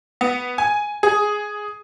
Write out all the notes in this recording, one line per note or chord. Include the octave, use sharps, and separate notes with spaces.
B3
G#5
G#4